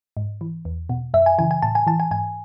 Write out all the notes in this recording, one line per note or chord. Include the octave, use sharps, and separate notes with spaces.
G#2
E3
E2
B2
F#2 E5
G#5
C#3 E3 G#5
G#5
A2 A5
G#5
E3 A5
G#5
G#2 G#5